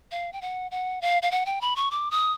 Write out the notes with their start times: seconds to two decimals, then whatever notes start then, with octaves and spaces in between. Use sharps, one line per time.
0.11 F5
0.33 G5
0.41 F#5
0.71 F#5
1.01 F5
1.22 F5
1.31 F#5
1.46 G5
1.61 B5
1.76 C#6
1.91 D6
2.11 D#6